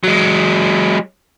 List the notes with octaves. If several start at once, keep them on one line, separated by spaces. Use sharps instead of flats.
F#3 G#3